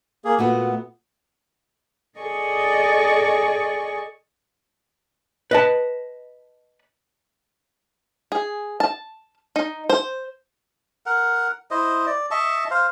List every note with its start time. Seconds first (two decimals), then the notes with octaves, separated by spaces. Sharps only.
0.25 A#3 G#4
0.39 A#2 A3 B3 F#4
2.19 G#4 A4 D5 D#5 G#5 C#6
5.51 B4 D#5 A5
8.32 G#4
8.80 A5
9.56 D#4
9.90 C5
11.06 A#4 F#5
11.71 E4 C5 D#5
12.07 D5
12.31 D#5 E5 A5 C#6
12.71 C5 F5